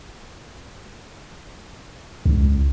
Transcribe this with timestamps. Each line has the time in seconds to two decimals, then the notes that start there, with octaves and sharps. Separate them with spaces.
2.25 C#2